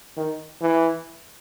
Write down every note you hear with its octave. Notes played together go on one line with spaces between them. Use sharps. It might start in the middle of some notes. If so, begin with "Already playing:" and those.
D#3
E3